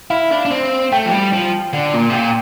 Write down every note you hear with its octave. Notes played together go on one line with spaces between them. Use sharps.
E4 F5
D4
D4
C4
A3 G5
F3
G3
F3
D3
A#2
C3
A#2 G5